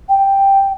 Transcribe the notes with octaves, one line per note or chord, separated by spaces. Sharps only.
G5